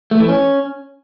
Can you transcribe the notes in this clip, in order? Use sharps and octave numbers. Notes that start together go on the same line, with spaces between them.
A3
E3
C#4